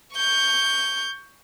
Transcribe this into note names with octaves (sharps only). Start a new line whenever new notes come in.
C#6 G6